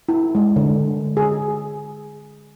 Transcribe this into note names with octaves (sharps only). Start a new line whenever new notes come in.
E4
G#3
D3
G#4